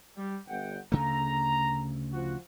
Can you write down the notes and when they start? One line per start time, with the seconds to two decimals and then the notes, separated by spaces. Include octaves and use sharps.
0.17 G3
0.48 G1 F#5 G5
0.92 D2 C#3 A3 A#5
2.13 F3 F#4